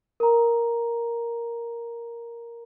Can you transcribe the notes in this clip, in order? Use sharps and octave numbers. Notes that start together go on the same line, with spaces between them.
A#4 A#5